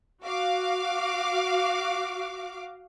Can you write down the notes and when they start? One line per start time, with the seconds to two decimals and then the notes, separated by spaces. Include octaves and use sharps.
0.22 F#4 F5 D6